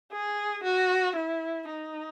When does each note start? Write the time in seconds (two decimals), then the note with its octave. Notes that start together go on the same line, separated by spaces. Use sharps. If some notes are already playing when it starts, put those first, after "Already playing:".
0.12 G#4
0.63 F#4
1.15 E4
1.68 D#4